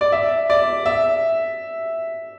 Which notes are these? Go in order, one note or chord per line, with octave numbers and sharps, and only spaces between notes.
D5
E5
D5
E5